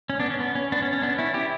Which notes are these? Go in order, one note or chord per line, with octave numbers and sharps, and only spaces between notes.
C#4
B3 D4
C#4
B3
C#4
B3 D4
C#4
C#4
B3 D4
C#4 E4
E4 G4